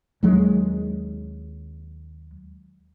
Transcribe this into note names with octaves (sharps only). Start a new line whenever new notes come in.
D#2 F#3 G#3